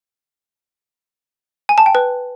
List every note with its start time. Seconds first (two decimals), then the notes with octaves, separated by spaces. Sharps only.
1.69 G#5
1.78 A5
1.86 G5
1.95 B4